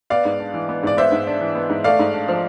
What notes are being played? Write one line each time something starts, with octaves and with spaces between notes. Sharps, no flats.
B3 D5 F5
G#2
D4
E3
B3
G#2 D5
B3 C5 E5
G#2
D4
E3
B3
G#2
A3 D5 F5
G#2
D4
F3